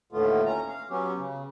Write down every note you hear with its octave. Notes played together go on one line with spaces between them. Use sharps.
D#2 A2 D3 A3 B3 F4
C#4 A#5
F5
F#3 B3 C#4 G4
C#3